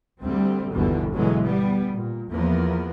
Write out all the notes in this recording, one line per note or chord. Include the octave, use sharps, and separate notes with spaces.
D2 D3 G3 C4
G1 D#2 B2 D3 E3 G3
B2 D3 E3 F#3 G#3
G3 B3
A#2
E2 F3 A#3 B3